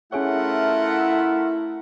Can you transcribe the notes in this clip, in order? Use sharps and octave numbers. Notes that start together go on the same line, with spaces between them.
A3 C#4 E4 F4 G#4 A#4 C#5 F#5